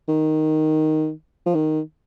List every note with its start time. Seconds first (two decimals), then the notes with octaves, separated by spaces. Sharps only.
0.08 D#3
1.47 F3
1.55 D#3